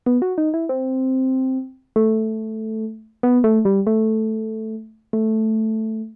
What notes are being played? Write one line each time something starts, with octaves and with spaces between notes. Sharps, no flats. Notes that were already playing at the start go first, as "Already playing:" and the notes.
B3
F#4
D#4
E4
C4
A3
B3
A3
G3
A3
A3